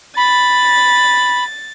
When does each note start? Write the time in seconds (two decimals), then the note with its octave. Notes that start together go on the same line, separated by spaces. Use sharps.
0.16 B5 A6